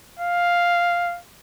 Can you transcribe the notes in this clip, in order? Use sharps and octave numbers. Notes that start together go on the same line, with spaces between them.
F5